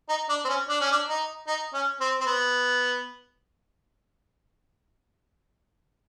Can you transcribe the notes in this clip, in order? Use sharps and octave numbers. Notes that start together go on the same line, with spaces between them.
D#4
D4
C4
C#4
D4
C#4
D4
D#4
D#4
C#4
C4
C4
B3